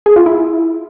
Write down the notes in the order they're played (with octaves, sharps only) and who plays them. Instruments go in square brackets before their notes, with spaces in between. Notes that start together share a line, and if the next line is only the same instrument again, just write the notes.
[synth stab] G#4
F4
E4